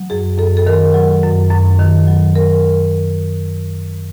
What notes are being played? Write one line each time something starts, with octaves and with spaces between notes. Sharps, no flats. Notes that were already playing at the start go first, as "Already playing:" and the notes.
Already playing: F#3
F#2 G#4
F#2 A4
A4
D#3 A#4
F#3
F#2
F#2
D#3
F#3
A#4